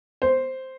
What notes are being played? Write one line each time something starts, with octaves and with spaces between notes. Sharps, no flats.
C5